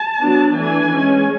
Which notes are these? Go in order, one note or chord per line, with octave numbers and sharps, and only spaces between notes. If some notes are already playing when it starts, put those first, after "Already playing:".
Already playing: A5
F#3 B3 D4
E3 A3 D4 G#5
G#3 C#4